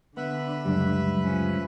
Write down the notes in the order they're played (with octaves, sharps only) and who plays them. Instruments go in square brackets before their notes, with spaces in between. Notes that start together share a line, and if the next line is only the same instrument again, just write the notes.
[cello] D3 [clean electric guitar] B3 [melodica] B4 E5 B5
[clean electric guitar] C#2 F#2 G3
[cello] F3 C#4